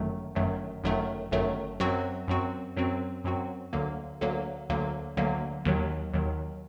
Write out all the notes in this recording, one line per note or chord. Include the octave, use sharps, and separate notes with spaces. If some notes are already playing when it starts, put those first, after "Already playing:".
Already playing: G1 F#2 D#3 F#3 A3
G1 F#2 D#3 F#3 A3
G1 F#2 D#3 F#3 A3
G1 F#2 D#3 F#3 A3
F#2 F#3 C4 F#4
F#2 F#3 C4 F#4
F#2 F#3 C4 F#4
F#2 F#3 C4 F#4
D2 D3 F#3 A#3
D2 D3 F#3 A#3
D2 D3 F#3 A#3
D2 D3 F#3 A#3
D#2 D#3 F#3
D#2 D#3 F#3